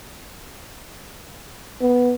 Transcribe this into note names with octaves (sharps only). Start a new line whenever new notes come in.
B3